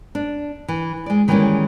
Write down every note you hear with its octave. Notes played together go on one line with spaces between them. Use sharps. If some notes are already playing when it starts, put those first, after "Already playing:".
D4
E3
G#3 D5
D#3 E3 G3 G#3 A#3 C#4